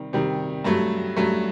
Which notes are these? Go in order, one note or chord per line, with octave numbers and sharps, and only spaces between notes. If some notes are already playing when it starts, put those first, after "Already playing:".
Already playing: C3 D#3 G3
C3 D#3 G3
G2 F#3 A3
G2 F#3 A3